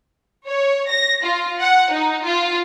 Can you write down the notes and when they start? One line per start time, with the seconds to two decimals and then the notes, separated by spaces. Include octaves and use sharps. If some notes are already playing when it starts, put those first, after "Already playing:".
0.47 C#5
0.90 A#6
1.24 F4
1.60 F#5
1.92 D#4
2.23 F4